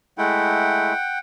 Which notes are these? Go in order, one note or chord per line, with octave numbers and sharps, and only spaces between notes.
G#3 A3 E4 F#5 G5